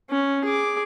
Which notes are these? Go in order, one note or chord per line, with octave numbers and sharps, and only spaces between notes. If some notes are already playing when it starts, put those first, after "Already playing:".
C#4
G#4 D6